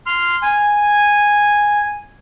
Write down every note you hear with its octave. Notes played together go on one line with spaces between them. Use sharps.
C6 F6
G#5